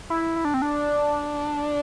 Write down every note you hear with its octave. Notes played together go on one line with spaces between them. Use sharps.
E4
E4
D4
C4
D4